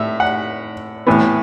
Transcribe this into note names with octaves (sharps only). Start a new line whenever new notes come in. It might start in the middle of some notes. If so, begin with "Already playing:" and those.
Already playing: A2 E5
F#5
A2 E3 B3